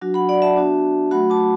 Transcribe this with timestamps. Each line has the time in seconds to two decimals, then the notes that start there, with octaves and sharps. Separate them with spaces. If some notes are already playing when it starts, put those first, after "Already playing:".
0.01 F#3 D4 F#4
0.14 F#5 B5
0.29 D5 F#5
0.42 E5 A5
0.57 B3 D4 F#4
1.11 F#3 A3 F#4 F#5 B5
1.30 A5 D6